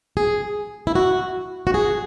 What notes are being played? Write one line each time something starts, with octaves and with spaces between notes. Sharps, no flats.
G#4
E4
F#4
F#4
G#4